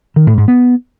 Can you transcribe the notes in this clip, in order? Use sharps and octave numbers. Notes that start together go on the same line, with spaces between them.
D#3
A2
G#2
B3